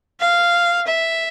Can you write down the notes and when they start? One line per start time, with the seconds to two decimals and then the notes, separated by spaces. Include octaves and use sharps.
0.20 F5
0.87 E5